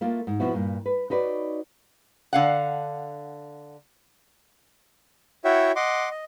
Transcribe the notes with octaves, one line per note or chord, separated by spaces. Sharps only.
A3 A#3 F4
G#2
B2 F3 B3 E4 F#4
G2 A#2
B4
D#4 F#4 B4 C#5 D5
D3 F5 F#5
E4 F#4 C#5 E5 F#5 G5
D#5 F#5 C6 D6
D#5